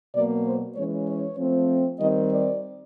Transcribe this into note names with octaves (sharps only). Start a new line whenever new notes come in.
B2 F#3 A#3 D5
C5
E3 G#3 C#4 C#5
C#5
F3 A3 C4
D#3 G3 C4 D#5
D5